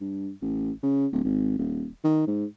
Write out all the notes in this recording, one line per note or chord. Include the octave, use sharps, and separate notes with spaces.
G2
A1
C#3
D1
G#1
D#1
D#3
G#2